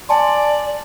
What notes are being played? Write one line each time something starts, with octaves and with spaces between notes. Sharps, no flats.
D5 G#5 A5 C6